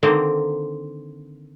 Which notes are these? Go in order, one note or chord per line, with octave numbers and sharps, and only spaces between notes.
D3 D#3 A#3 C4